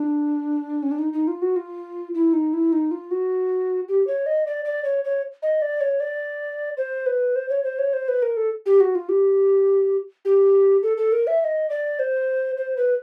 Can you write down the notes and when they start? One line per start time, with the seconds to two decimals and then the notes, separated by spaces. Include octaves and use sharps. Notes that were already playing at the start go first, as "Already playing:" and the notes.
Already playing: D4
0.83 C#4
0.91 D4
0.99 D#4
1.13 D#4
1.28 F4
1.42 F#4
1.56 F4
2.14 E4
2.33 D#4
2.53 E4
2.72 D#4
2.91 F4
3.11 F#4
3.89 G4
4.07 C#5
4.26 D#5
4.47 D5
4.65 D5
4.84 C#5
5.04 C#5
5.42 D#5
5.62 D5
5.81 C#5
6.00 D5
6.77 C5
7.06 B4
7.36 C5
7.50 C#5
7.64 C5
7.79 C#5
7.93 C5
8.08 B4
8.22 A#4
8.37 A4
8.66 G4
8.80 F#4
8.95 F4
9.09 G4
10.25 G4
10.83 A4
10.97 A4
11.12 A#4
11.27 E5
11.40 E5
11.44 D#5
11.70 D5
11.99 C5
12.57 C5
12.77 B4